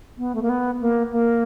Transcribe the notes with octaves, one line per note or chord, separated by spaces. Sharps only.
B3
A3
A#3
B3
A#3
A#3